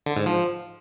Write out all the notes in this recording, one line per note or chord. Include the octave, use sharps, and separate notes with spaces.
D3
G#2
F3